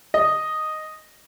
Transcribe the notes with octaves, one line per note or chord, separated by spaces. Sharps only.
D#5